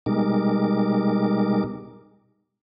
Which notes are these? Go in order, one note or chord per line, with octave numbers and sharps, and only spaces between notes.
B2 G3 G#3 D#4 A#4 D6